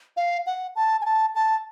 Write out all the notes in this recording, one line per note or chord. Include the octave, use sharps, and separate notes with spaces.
F5
F#5
A5
G#5
A5
A5